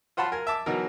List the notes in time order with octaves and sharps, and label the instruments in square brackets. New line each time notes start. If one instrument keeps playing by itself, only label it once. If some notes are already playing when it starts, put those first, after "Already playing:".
[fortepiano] F4 C5 F#5 A5 B5 C6
A#4 G#5
E5 A5 D6
B2 E3 F#3 D#4 A#4